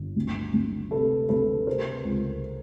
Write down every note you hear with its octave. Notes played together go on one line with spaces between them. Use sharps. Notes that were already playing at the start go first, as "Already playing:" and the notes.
Already playing: G1
D2
D2
C3 A4 B4
D2 A4 B4
C3 A#4 C5
C#2